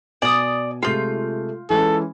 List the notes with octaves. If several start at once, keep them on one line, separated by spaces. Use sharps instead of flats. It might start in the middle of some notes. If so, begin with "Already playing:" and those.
B2 D5 G#5 D#6
C3 G#3 A3 F4 G6
E3 G#3 C#4 A4